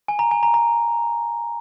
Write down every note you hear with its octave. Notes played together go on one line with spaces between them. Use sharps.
G#5
A#5
G#5
A#5
A#5